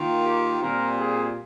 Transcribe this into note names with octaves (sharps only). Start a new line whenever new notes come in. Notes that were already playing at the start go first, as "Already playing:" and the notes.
Already playing: D#3 A#3 F4
G4
A#2 G3 C4 F4 A#4
G#4